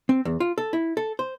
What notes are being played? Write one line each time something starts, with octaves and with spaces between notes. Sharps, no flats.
C4
E2
F4
A4
E4
A4
C5